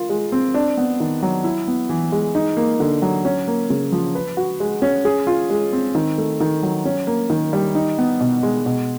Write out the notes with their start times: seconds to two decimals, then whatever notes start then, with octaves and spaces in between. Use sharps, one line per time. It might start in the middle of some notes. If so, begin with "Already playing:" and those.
Already playing: F4 A#4
0.10 G#3
0.32 C4
0.54 D4
0.77 B3
1.00 D#3
1.23 F#3
1.44 E4
1.68 B3
1.89 E3
2.12 G#3
2.35 D#4
2.57 A#3
2.80 D3
3.02 F#3
3.25 C#4
3.48 A#3
3.70 C#3
3.92 F3
4.15 B4
4.37 F#4
4.60 G#3
4.82 C#4
5.05 G#4
5.27 F4
5.50 G#3
5.73 C4
5.95 D#3
6.18 A3
6.40 D#3
6.63 F#3
6.85 C#4
7.07 A#3
7.30 D#3
7.53 G3
7.75 D#4
7.98 B3
8.21 B2
8.43 G#3
8.66 B2